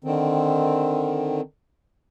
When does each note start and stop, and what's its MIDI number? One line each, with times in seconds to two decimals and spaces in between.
0.04 1.41 50
0.04 1.41 51
0.04 1.41 60